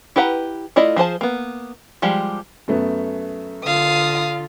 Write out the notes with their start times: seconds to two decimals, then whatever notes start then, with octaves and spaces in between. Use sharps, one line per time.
0.16 E4 G4 B4 F#5 A#5
0.76 A3 E4 F4 D5 D#5
0.96 F3 G#4 C5 A5
1.21 A#3 B3
2.02 F3 G3 G#3 G4
2.68 F#2 A3 B3
3.64 D3 F4 F5 D#6